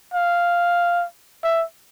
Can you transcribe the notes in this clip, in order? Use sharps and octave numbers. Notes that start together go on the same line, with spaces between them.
F5
E5